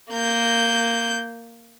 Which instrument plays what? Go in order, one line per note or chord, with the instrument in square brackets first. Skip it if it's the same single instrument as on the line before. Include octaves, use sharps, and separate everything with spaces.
[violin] A#3 G6